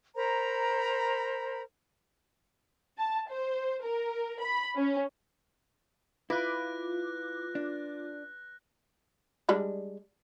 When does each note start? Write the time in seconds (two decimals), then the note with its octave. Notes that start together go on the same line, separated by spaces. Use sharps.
0.15 A#4 C5 A#5 B5
2.99 A5
3.30 C5
3.84 A#4
4.42 B5
4.76 C#4
6.30 E4 F4 B4 D6 F#6 A#6
7.55 D4
9.49 G3 G#3 D4